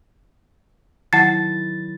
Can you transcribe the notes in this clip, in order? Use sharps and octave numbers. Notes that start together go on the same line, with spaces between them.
D#3 F#3 E4 F#5 A5 A6 C7